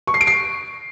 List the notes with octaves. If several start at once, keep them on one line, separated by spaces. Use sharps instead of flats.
C#6
C7
D7
C7